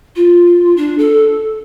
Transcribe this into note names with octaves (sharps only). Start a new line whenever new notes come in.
F4
D4
A4